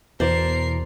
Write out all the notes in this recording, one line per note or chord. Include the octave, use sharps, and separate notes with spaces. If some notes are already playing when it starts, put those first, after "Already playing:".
E2 B2 E3 A#4 C5 D5 A5 C7